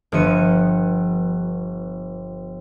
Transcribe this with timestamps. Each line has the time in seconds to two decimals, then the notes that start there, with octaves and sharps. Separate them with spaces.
0.12 G1 F3 B3 C#7 D#7